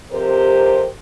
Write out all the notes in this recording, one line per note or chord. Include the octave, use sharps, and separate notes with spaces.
F2 C3 G4 A#4 C5